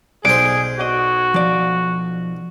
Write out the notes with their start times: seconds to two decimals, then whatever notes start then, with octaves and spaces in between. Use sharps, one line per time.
0.25 B1 G#4 C5 D5 D7
0.80 F#4 D5 D#5
1.34 F3 D5